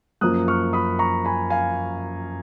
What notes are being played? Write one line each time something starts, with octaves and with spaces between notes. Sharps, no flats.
F#2 F3 A#3 D#6 F#6
C#6 F6
B5 D#6
A#5 C#6
G#5 B5
F5 G#5